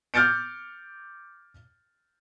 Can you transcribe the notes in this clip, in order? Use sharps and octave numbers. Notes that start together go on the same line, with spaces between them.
D6 F6 G6 A6 C#7 D7